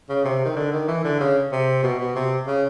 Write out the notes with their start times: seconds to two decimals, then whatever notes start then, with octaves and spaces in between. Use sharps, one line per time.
0.09 C#3
0.25 C3
0.45 D#3
0.56 D3
0.72 D#3
0.88 E3
1.04 D3
1.20 C#3
1.52 C3
1.83 B2
1.99 B2
2.15 C3
2.47 C#3